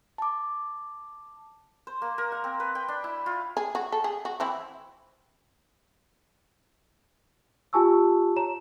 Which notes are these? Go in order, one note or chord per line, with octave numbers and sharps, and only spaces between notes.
A5 D6
C5
A#3
A#4
F#5
C4
B4
G5
D4
E4
F4
G#4
F#4
A4
G#4
F#4
E3 C4 E4
F4 G4 G#5 A5 C#6 E6
C#5 A#5 E7